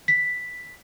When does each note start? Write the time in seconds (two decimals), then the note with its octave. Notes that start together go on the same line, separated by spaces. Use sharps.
0.08 B6